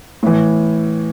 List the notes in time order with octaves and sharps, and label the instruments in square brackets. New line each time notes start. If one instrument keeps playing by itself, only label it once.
[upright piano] A2 E3